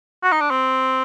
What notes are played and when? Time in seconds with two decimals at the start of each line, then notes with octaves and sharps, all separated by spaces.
0.23 F#4
0.32 D#4
0.41 D4
0.51 C4